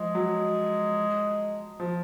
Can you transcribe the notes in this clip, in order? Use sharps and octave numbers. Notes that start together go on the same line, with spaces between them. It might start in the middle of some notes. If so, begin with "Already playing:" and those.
Already playing: F3 G#3
F#3
F3